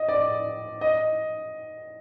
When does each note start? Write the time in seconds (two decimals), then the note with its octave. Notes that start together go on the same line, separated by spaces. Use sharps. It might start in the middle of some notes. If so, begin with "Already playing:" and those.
Already playing: D#5
0.09 D5
0.81 D#5